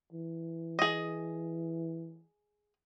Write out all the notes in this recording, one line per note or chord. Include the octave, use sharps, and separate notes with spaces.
E3
G#4 D#5